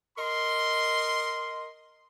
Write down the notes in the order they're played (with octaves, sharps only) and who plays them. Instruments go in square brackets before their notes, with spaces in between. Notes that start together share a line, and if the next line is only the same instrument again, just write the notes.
[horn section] A#4 D#5 C6